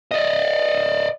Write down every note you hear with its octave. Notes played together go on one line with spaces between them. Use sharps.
D5 D#5